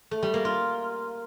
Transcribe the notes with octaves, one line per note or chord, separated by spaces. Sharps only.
A3
G3
A#3
F4